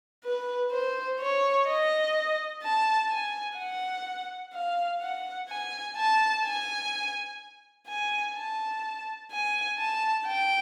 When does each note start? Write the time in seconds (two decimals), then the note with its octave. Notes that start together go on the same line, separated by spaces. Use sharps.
0.24 B4
0.72 C5
1.20 C#5
1.67 D#5
2.63 A5
3.10 G#5
3.58 F#5
4.54 F5
5.01 F#5
5.49 G#5
5.97 A5
6.44 G#5
7.87 G#5
8.35 A5
9.31 G#5
9.78 A5
10.26 G5